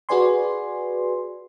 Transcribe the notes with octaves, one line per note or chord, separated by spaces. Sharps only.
F#4 G#4 B4 D5 G#5 C6